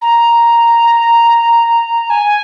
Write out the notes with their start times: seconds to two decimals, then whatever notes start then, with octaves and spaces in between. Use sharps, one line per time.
0.01 A#5
2.09 G#5